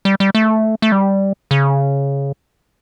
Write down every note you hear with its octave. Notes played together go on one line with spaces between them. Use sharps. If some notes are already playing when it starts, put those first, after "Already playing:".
G3
G3
A3
A3
G3
C#3